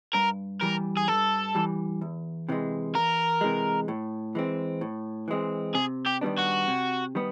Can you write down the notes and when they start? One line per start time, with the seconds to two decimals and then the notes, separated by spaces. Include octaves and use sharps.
0.14 G2 A#4
0.61 E3 G3 A#4
0.97 G#4
1.08 G2 A4
1.55 E3 G3
2.01 E2
2.49 C3 E3 G#3
2.95 E2 A#4
3.41 C3 E3 G#3
3.88 A2
4.35 E3 G#3 C4
4.81 A2
5.28 E3 G#3 C4
5.74 C3 G#4
6.06 G4
6.21 D#3 G3 B3 D4
6.38 F#4
6.68 C3
7.15 D#3 G3 B3